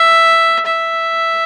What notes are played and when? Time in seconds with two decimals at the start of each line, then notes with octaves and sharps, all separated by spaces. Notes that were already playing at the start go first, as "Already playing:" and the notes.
Already playing: E5
0.66 E5